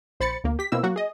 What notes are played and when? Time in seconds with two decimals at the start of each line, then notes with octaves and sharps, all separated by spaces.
0.20 A#1 C5 B5 A6 C#7
0.44 D2 A#3
0.59 G4 B6
0.72 B2 A#3 C4 E4 E6
0.83 F#3 A#3 F#4
0.96 G#4 D#5